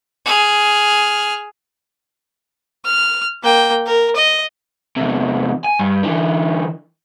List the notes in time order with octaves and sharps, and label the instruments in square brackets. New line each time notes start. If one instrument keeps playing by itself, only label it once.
[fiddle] G#4 F6
F6
A#3 G5
A#4
D#5
[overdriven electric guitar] E2 C3
G#5
G2
D3 E3